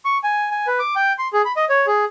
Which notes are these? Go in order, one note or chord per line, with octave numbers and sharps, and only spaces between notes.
C#6
G#5
G#5
B4
D6
G5
C6
G#4
B5
D#5
C#5
G#4